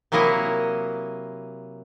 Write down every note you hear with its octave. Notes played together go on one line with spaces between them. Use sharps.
C3 F#3 A#3 E4 D#5